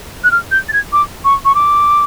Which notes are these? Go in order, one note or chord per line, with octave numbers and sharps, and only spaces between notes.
F#6
F6
G6
A6
G#6
D6
C#6
C#6
D6